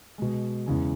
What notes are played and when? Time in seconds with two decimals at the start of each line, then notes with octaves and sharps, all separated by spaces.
0.18 B2 G#3
0.66 E2 C#3 G#3